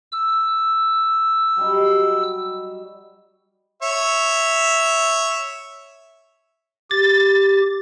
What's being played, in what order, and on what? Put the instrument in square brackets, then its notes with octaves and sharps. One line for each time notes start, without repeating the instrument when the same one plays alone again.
[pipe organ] E6
[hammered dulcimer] F#3 G3 D#4
[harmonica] C#5 E5
[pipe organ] G4 [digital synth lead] A6